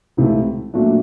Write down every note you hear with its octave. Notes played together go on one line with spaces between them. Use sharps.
C#2 C3 E3 A3
A#2 F#3 A3 D4 F#4